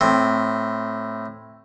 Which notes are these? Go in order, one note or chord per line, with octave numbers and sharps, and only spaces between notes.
A2 C4